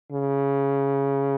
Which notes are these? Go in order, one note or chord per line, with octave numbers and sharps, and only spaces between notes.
C#3